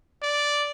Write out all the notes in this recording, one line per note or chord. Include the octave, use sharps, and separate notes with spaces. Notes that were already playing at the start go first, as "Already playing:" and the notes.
D5